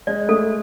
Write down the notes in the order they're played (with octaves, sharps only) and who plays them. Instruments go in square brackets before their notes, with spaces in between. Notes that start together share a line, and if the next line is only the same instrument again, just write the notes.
[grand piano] G#3 [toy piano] D5
[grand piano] A3 [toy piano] A4